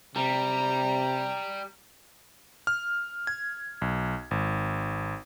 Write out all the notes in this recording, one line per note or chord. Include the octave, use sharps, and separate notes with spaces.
C3 G3 A#5
F6
G#6
B1
G#1